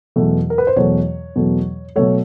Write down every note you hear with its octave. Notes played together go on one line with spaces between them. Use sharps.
E2 B2 F#3 A3
A#4
B4
C5
E2 B2 F#3 A3 C#5
E2 B2 F#3 A3
B2 F#3 A3 C#5